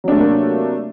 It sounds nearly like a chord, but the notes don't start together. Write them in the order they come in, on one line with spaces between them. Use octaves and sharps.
F#3 D4 A3 C3 A#3